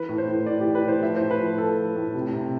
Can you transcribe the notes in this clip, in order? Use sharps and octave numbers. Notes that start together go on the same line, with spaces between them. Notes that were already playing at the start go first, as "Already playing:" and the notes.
Already playing: E3 B4
A2
C5
A2
A2 D5
G4
E3
B4
A2 C5
F3 E5
A2 C5
B4
F3
F3 A4
F3
A2
C3
C3